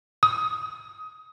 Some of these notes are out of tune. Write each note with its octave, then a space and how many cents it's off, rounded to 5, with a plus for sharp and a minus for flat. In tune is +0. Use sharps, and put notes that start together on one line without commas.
D#6 +20